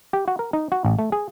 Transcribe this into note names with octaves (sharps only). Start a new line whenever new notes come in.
G4
F#4
A#4
D#4
F#4
A1
A3
G#4